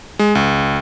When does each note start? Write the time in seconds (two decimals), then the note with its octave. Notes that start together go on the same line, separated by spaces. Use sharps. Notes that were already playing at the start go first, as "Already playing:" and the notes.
0.19 G#3
0.35 C#2